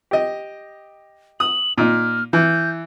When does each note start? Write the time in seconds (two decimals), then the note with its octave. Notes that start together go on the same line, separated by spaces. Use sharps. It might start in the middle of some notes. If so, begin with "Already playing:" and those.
0.11 G4 D#5
1.40 D#6 F#7
1.78 A#2 D#4 F6
2.33 E3 G6